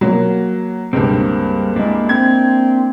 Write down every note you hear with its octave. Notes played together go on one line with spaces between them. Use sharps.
F#3 A#3
C#2 G2 G3 A#3 C4
G#3 A#3 D4 E4
C4 G#6